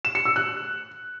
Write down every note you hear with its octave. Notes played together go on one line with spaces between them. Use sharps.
E7
C#7
E6
F#6